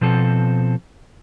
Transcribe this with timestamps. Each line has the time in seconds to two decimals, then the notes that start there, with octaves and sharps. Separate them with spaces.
0.01 B2 F3 C4 A4